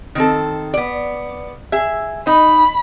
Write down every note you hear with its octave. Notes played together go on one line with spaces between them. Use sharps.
D#3 C4 A4
B3 D5
G#4 E5
D#4 B5